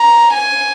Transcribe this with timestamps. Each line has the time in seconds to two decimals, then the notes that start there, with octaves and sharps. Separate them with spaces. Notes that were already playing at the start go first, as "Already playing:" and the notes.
Already playing: A#5
0.33 G#5